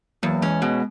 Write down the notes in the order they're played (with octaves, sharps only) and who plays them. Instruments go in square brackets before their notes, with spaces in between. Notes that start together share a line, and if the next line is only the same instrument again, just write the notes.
[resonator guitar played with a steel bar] E2 [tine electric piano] F#3 A#3
[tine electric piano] E3 G#3 [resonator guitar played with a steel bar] C#4
[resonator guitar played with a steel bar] B2 [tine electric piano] G#3 B3